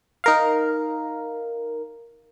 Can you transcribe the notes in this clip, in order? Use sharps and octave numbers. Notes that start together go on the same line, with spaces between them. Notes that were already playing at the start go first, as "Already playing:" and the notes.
D#4 A#4 F5